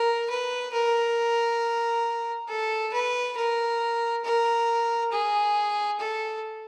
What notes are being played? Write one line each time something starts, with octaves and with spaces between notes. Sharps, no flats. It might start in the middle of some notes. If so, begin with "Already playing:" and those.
Already playing: A#4
B4
A#4
A4
B4
A#4
A#4
G#4
A4